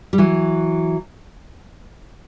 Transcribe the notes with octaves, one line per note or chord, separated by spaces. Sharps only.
G3
E3 F#3